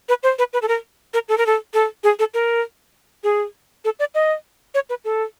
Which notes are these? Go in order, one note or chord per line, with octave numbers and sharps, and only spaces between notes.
B4
C5
B4
B4
A4
A#4
A#4
A4
A#4
A4
A4
G#4
A4
A#4
G#4
A4
D5
D#5
C#5
B4
A4